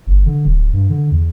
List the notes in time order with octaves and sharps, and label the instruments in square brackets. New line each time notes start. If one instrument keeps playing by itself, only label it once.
[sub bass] G1
D3
D1
G2
D3
E2